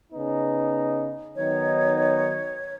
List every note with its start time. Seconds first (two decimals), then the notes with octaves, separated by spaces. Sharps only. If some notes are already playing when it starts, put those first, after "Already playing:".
0.13 C#3 B3 D#4
1.36 D#3 F#3 B3 D#4 C#5